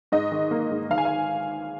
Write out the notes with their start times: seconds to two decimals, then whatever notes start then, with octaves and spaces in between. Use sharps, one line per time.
0.12 G#2 D#5
0.32 D#3
0.51 A#3
0.71 G#2
0.90 G#1 F5
0.98 G#5
1.05 F5